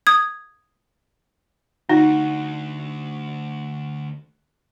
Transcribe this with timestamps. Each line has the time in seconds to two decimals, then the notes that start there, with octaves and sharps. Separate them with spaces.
0.07 D#6 G#6
1.89 D2 D#4 F#4